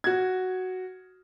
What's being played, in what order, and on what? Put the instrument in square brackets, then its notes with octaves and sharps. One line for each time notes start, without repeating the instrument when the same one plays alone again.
[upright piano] F#4 G#6